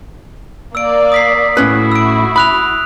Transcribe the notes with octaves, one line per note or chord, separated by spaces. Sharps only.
A#3 D5 E6 D7
D#6 B6 C7
A2 C#4 E4 F#4 B4
E6 D7
B5 D#6 F#6 F7